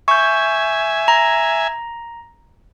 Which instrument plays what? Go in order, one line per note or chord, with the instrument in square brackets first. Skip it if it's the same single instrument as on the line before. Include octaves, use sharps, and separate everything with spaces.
[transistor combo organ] E5 G#5 [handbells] C#6 G6
[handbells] A#5